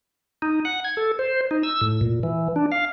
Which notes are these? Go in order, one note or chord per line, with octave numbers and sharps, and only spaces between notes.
D#4
F#5
G#6
A4
C5
D#4
E6
A2
A#2
E3
D4
F5